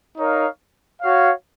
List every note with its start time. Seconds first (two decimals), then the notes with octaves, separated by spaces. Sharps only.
0.18 D#4 A#4 C#5 F5
1.02 F#4 C#5 F5